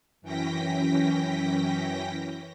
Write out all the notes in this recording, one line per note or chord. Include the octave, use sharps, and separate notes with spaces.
F#2 E3 C#4 G5 A#6 B6